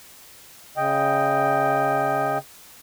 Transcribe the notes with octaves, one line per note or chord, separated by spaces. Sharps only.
C#3 D#5 G5